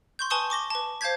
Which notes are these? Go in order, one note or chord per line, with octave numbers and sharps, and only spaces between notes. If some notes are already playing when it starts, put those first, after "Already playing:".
C6 C#6 G6
B4 G#5 A5 C#6 D#6 G7
C#6 D6 A#6 G7
B4 A5
C5 F5 A5 G6 G#6 B6